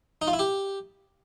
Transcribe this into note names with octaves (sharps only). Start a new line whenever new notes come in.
D#4
F4
E4
G4